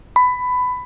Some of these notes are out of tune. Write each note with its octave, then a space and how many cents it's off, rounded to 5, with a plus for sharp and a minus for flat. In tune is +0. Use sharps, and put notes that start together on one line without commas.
B5 +15